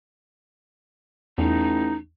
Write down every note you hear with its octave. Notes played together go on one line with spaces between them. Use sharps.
A1 E2 D#4